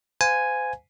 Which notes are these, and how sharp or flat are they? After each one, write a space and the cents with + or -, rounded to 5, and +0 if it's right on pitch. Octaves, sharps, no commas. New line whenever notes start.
C5 -35 F5 +20 G#5 +0